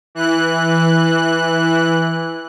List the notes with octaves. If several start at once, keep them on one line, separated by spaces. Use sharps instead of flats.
E3 F#6